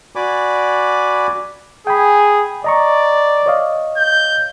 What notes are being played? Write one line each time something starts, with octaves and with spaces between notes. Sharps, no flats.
F#4 D5 G#5 B5 D6
G#4 G5 G#5 B5
D5 D#5 A#5 C#6
C#5 D#5 F5
G6